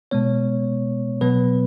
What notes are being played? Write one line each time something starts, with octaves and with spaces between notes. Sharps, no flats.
B2 G#3 B3 C#5
B2 F#3 B3 B4